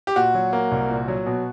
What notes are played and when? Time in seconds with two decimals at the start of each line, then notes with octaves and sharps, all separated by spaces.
0.07 G4
0.16 A#2 F#4
0.34 F#3
0.53 A#3
0.71 C2
0.90 A#2
1.08 F#3
1.26 B2